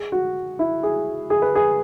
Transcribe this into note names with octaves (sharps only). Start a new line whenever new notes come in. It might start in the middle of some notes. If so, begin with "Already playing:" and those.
Already playing: G#4
F#4
E4
G#4
G#4
B4
G#4